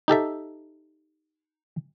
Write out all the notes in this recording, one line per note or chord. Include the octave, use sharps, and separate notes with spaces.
D#4 G4 A4 E5